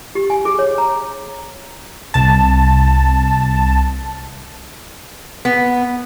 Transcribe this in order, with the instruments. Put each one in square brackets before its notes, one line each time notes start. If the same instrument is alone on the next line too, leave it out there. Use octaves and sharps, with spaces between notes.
[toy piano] G4
G#5
G#4
C#5
A#5
[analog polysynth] C2 A5
[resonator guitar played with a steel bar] B3